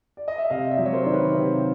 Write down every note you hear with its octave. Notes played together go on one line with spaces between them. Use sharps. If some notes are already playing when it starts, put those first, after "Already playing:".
D5
D#5
E5
C3 D#5 F5
D5 E5
F#3
C#5
A#4 C5
D#3 D5
B4 C#5
C3